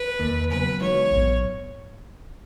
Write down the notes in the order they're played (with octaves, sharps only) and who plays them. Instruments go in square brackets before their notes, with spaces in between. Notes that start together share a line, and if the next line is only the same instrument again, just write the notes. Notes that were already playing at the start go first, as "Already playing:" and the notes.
Already playing: [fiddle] B4
[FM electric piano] E2 D#3 A#3
[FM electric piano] C#3 F#3 B3 [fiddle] B4
[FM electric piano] E3 G#3 B3 D#4 F#4 [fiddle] C#5
[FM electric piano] A#1 G#2 F#3 B3